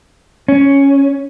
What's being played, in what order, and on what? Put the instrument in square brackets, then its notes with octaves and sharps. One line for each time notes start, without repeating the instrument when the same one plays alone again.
[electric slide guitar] C#4